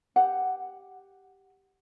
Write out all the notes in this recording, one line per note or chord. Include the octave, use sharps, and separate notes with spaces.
G4 F#5